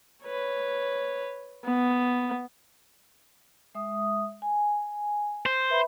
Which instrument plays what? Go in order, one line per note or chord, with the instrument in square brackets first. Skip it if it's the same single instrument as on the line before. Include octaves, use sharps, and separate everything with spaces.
[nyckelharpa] B4 C#5
B3
[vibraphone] G#3 E5 D#6
G#5
[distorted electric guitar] C5
[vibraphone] B4 E5 B5